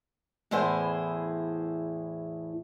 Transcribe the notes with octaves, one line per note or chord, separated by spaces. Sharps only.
E2 A2 E4 G#4 C5